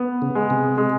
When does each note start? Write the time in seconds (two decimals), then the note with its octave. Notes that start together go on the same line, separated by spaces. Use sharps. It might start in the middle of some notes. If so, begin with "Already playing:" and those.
Already playing: B3
0.22 C#3
0.35 G#3
0.50 C3
0.78 G#3